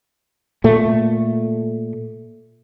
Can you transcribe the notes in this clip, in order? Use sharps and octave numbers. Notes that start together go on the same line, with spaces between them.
A#2 A3